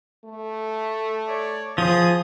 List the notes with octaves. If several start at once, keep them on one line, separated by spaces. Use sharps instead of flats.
A3
C#5 D5
F3 G#4 D#6